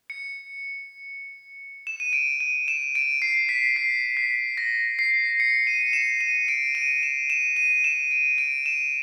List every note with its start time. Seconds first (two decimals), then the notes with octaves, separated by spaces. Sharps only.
0.10 C#7
1.87 E7
2.00 D#7
2.13 D7
2.40 D#7
2.68 E7
2.95 D7
3.22 C7
3.49 B6
3.76 C7
4.17 B6
4.58 A#6
4.99 C7
5.40 C#7
5.67 D#7
5.93 E7
6.21 D#7
6.48 D7
6.75 D#7
7.03 E7
7.30 E7
7.56 D#7
7.84 E7
8.11 D7
8.38 D7
8.66 E7